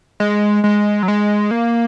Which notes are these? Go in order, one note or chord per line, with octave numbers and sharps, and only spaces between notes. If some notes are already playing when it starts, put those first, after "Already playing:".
G#3
G#3
F#3
G#3
A#3